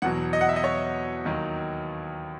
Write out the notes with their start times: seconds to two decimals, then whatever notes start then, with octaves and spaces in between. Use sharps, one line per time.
0.02 E2 B2 F#3 F#5
0.33 D#5
0.41 F#5
0.49 E5
0.56 D#5
0.64 C#5
1.25 D#2 D#3 F#3